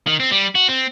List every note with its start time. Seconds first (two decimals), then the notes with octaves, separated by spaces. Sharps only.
0.07 D#3
0.20 C4
0.31 G3
0.55 F#4
0.68 C4